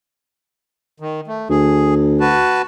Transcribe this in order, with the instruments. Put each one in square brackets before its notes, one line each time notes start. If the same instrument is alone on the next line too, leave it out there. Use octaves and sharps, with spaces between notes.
[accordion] D#3
A3
[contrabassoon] D2 [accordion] G#4
[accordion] F#4 B4 A5